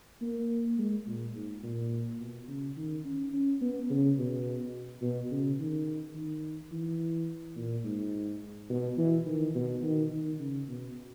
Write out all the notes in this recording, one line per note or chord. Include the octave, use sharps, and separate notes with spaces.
A#3
G#3
A#2
G#2
A#2
B2
C#3
D#3
C#4
C#4
B3
C#3
B2
B2
C#3
D#3
D#3
E3
A#2
G#2
B2
E3
D#3
B2
D#3
D#3
C#3
B2